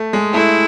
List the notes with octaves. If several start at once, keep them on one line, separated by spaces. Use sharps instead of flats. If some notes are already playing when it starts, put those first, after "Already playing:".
Already playing: A3
G#3
A3 E4